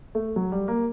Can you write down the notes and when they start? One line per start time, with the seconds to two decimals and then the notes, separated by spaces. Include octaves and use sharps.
0.15 A3
0.36 F#3
0.52 G3
0.68 A#3